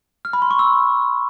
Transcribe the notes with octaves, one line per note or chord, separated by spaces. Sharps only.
F6
B5
C6
C#6
E6